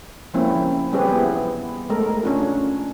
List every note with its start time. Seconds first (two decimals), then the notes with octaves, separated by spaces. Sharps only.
0.34 F3 G#3 A#3 C4 C#4 E4
0.93 G3 C4 G4 G#4 B4 C#5
1.12 B3 E4
1.90 G#3 A3 A4 A#4
2.23 C#4 D4 F4